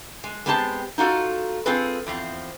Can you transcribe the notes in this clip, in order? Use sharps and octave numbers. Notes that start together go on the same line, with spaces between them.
G#3
G#3 B3 C4 G4 C5 A5
D#4 F4 F#4 A4
C4 F4 G#4 A4 B4
E2 F3 C4